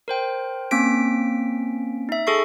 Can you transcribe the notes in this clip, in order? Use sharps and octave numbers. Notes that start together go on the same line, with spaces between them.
A#4 C5 G5
A#3 C4 C#4 B6 D7
D#4 E5
G#4 A4 C#6 C7